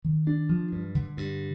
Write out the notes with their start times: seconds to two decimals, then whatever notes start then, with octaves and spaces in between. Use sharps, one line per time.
0.04 D#3
0.27 D4
0.49 F3
0.72 G2
0.95 D3
1.17 G2